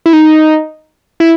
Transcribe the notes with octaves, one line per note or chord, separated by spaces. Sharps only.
E4
D#4
E4